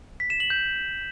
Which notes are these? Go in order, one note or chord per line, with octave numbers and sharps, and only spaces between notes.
B6
E7
F#7
G6